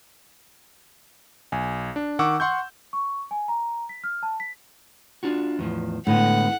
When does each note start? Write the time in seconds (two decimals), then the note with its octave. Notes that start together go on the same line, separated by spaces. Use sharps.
1.52 B1 G#5
1.96 D4
2.19 D#3 F#5 C#6 D6 E6
2.40 F#5 C6 C#6 G6
2.93 C#6
3.31 G#5
3.48 A#5
3.89 B6
4.04 F6
4.23 A5
4.40 B6
5.23 D4 F4 F#4
5.59 E2 A2 F3
6.07 A2 D3 G#3 B3 F#5